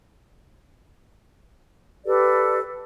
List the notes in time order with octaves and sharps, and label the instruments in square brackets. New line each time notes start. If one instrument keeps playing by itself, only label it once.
[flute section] G4 A4 B4 D5